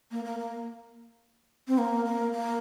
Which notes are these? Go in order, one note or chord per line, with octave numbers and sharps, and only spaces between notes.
A#3
A#3
A#3
C4
A#3
A#3
A#3